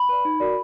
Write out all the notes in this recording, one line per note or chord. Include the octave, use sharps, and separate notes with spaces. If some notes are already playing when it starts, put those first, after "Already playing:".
Already playing: B5
B4 D5
D#4
F#4 A#4 D5